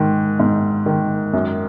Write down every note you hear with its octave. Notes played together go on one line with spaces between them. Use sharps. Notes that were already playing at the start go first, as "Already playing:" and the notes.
Already playing: G#2 D#3
G#2
D#3
F#2